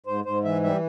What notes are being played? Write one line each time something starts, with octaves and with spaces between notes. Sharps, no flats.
G#2 C5
G#2 C5
E3 E5
G3 E5